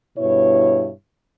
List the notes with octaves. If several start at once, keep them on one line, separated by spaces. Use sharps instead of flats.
G2 B2 E4 C#5